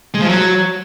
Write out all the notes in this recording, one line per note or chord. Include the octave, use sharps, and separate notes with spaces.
G#3
F3
F#3